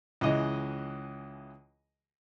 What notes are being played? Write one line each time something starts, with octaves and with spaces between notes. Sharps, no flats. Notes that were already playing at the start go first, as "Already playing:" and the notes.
C#2 E3 G#3 D#5 D#6